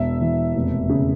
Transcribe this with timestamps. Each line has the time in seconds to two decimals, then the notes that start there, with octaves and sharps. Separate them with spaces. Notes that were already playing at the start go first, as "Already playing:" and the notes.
Already playing: E1 E5
0.21 E3
0.55 F1
0.89 C#3